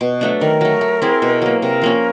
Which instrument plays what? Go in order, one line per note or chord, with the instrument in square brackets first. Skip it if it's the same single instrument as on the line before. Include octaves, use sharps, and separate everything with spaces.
[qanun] B2
F#3 A3 D4
[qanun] D#3 [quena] A#4
[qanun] F#3 A3
A3
C4 E4 G#4
B2
F#3 A#3
[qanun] C3 [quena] A#4
[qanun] F3 A#3 C#4